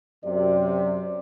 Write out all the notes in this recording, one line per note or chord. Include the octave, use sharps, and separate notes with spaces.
F#2 C3 D5